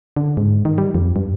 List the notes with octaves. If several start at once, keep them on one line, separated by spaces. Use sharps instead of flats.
D3
G#2
D#3
G3
F2
G2